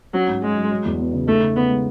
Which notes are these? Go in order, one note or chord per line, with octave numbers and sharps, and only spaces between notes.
F#3 C#4
G#2
G#3 F#4
F#3
F#3
E2
B3
C#3
A3 D#4
C#3
C#3 B3
G#3